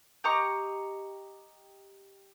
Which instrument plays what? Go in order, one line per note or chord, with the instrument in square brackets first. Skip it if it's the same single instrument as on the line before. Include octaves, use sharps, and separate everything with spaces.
[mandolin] G4 D#5 A#5 C#6